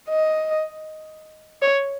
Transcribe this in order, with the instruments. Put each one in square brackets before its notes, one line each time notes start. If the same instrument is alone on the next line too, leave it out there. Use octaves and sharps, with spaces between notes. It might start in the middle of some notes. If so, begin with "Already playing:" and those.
[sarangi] D#5
C#5